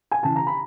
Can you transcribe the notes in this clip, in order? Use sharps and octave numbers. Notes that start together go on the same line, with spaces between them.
G#5
C#3 E3 A5
A#5
B5